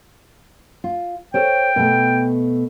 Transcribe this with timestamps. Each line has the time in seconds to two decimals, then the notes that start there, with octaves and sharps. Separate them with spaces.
0.84 F4
1.34 A4 C5 C#5 G5
1.76 B2 A3